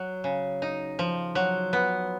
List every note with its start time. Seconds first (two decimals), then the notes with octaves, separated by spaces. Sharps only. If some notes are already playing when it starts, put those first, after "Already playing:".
Already playing: F#3
0.24 C#3
0.62 D#4
0.99 F3
1.35 F#3
1.73 B3